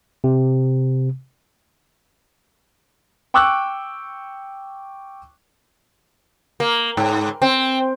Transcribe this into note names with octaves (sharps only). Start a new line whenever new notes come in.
C3
G5 C#6 D6 E6 F#6
A#3
G#2
C4